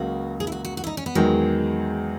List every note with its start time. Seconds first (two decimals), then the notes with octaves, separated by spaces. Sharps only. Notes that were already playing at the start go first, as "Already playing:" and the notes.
Already playing: C#2 C#3 F#3 A#3 F#4
0.40 G#4
0.47 E4
0.52 F#4
0.65 F#4
0.77 F#4
0.84 E4
0.87 D#4
0.97 C#4
1.06 B3
1.15 E2 D#3 F#3 G#3